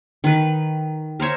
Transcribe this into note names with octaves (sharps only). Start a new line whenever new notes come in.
D#3 B4
A#4 C5 C#5 E5